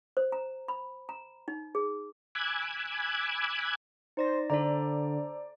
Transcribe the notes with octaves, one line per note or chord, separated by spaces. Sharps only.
C5
A#5
B5
A#5
D#4
G#4
G#5 B5 D6 E6 F#6 G#6
D#4 C5 D5 A#6
D3 A4 C5 D5 A#5